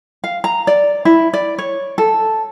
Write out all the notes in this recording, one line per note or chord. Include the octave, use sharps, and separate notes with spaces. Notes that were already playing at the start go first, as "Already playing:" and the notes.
F5
A#5
D5
E4
D5
C#5
A4